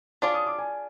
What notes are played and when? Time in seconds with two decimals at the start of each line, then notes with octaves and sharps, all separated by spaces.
0.22 D4 F4 G#4 C#5 D6
0.34 D#6
0.47 D6
0.59 G#5